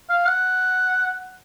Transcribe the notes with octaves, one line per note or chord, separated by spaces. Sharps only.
F5
F#5